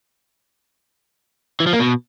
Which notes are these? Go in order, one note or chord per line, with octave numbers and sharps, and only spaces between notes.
E3
F3
A#3
B2